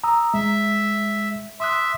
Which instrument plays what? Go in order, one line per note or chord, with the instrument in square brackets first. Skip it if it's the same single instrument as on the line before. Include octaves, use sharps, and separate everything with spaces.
[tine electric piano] A#5 D#6 E6
[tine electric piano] G#3 [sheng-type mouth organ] E5
[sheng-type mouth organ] E5 [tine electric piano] C6 D#6 F#6